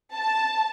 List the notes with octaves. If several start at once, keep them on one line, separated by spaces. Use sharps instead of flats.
A5